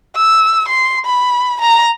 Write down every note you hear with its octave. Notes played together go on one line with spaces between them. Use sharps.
E6
C6
B5
A#5